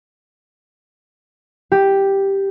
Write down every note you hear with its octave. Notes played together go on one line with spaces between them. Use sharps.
G4